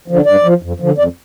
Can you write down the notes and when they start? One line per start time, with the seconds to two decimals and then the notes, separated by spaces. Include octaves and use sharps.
0.08 D3 F3
0.26 G2 D5
0.44 F3
0.63 F2
0.80 D3 F3
0.98 F2 D5